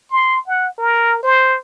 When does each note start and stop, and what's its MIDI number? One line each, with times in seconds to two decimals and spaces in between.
0.10 0.41 84
0.47 0.68 78
0.78 1.21 70
1.23 1.57 72